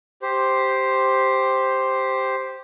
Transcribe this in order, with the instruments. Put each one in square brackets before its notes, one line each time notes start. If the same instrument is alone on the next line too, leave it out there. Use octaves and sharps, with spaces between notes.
[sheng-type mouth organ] G4 C5